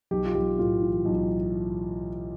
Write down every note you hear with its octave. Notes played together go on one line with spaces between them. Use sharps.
B1 G4
F4
B1 G4
A2 F4
E3
B1